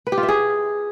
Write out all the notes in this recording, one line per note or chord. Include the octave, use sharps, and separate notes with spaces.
B4
G4
F4
E5
G#4